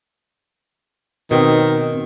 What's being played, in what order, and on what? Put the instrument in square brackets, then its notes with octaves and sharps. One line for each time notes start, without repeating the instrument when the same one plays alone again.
[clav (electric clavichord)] B2 C4 [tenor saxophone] D#3